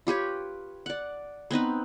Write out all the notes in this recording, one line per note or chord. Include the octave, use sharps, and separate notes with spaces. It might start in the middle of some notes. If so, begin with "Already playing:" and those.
F4 G4 B4 C#5
D5 F#5
B3 C4 D#4 B4